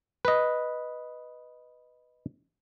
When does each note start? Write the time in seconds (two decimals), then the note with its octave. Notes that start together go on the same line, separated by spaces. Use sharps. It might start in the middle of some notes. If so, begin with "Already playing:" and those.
0.25 B4 D#5